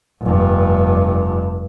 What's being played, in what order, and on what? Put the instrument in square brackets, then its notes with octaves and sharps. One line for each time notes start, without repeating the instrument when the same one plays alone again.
[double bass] F1 G2